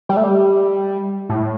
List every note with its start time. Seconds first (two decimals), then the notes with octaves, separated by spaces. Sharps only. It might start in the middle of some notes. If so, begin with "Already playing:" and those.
0.09 G3
0.17 A3
0.24 G3
1.30 A2